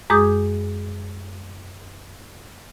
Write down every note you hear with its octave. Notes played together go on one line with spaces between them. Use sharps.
F#2 G#3 G#4 D6 D#6 G6